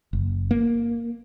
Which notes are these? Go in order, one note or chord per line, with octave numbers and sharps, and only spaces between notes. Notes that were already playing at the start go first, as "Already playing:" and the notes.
F#1
A#3